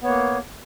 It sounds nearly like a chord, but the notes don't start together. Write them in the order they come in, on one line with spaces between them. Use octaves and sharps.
B3 C#5 A#3